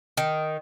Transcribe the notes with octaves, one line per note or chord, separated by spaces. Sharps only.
D#3